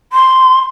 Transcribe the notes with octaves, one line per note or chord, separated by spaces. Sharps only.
C6